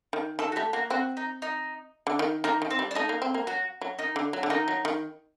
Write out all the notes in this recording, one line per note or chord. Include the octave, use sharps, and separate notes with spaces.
D#3
D#3 A4
F#4
A3 G4
A#3 F#4
C4 F#4
D#4
D#4
D3
D#3
D#3 A#3
D#3
C4
G3
D4
A3 D#4
A#3
C4
A#3
F#3 F#4
F#3
D#3 D#4
D3
F#3
D3
D#3 D#4
F#3
D#3